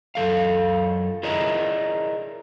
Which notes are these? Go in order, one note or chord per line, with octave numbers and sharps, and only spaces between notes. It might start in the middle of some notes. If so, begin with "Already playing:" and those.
F#2 D#3 A4 F5
E4 G#4 A#4 D5 D#5